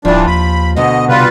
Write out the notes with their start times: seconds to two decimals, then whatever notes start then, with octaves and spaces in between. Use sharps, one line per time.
0.05 D1 E3 F3 G3 D4 F4
0.27 D#2 B5
0.76 D2 B2 D3 D#5
1.09 C3 G3 F4 B4